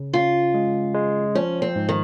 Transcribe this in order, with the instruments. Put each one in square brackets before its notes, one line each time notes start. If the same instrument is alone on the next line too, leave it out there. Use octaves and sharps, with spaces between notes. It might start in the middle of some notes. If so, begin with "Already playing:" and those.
Already playing: [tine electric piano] C#3
[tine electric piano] C#4 [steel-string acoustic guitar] F4
[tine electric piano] G#3
G#3
[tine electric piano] F3 [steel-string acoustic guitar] C#4
[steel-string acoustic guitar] C4
[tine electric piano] G#2
[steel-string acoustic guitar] D#3